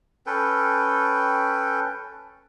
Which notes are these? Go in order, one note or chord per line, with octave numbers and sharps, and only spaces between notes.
C#4 A4 B4 G5